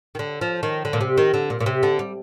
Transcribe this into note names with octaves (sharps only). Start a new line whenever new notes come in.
D#3
D3
F3
D#3
D3
A#2
C3
D#3
D3
A#2
A#2
C3
D3
G3